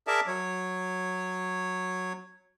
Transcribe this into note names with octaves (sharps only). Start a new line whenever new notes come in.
G#4 A#4 D5 E5 A5
F#3 C#5